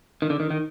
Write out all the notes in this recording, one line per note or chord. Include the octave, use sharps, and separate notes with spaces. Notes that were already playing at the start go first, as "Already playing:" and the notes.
D#3
D3
D#3
D#3